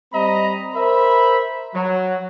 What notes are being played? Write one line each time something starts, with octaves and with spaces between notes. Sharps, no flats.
G3 C4 D#5 A#5 B5
A#4 C5 E5 B5
F#3